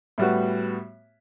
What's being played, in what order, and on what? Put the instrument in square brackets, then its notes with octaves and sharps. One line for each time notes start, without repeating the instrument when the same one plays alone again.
[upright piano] A2 G3 B3 F#4